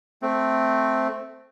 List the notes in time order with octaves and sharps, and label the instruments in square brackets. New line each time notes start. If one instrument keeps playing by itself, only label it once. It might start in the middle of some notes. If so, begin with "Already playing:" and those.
[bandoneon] A3 C4